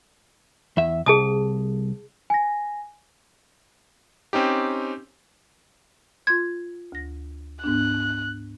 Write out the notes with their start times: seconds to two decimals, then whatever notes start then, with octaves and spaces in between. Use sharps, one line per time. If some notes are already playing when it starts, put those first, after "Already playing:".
0.77 E2 E5
1.06 C2 G#4 A5 D#6
2.30 G#5 A#6
4.33 C4 C#4 D#4 G4
6.27 F4 C6 G#6
6.92 D2 A#6
7.64 G#2 B3 D4 F#6